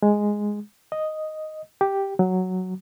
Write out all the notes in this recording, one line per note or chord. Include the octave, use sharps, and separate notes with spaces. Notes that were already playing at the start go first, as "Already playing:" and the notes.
G#3
D#5
G4
F#3